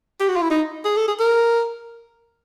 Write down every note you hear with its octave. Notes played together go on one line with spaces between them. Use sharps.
G4
F#4
F4
E4
D#4
G#4
A4
G#4
A#4